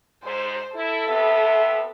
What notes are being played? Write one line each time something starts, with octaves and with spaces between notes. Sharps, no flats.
G#2 C5
E4 A4
C3 B3 E5